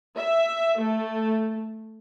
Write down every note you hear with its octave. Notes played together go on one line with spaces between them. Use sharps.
E5
A3